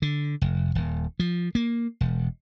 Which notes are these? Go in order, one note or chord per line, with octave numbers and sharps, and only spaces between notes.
D3
F1
D#1
F3
A#3
E1